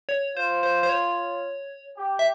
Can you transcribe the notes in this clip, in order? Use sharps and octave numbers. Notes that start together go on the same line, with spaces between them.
C#5
F4 C5
C5
C5
C#5
G4
E5